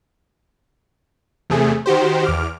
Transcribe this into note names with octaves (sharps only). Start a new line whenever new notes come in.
E2 C3 A3 G#4
D#3 F#4 G4 C5
E2 D6 F6